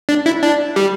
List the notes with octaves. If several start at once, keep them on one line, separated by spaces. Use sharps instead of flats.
D4
E4
D4
G3